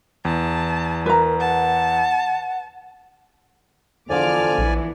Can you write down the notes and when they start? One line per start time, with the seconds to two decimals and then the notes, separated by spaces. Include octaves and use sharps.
0.25 E2 A5
1.06 A#4 B4 A#5
1.40 F#5 A5
4.10 E2 D3 F3 D5 G#5 D6 F6
4.58 A#1 E3 B3